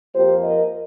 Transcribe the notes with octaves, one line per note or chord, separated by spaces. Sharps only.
F2 F3 A#3 G4 C5
A#4 D#5